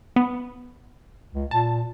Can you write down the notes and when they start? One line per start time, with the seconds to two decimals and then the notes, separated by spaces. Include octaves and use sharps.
0.16 B3
1.35 C#2
1.51 A#2 A5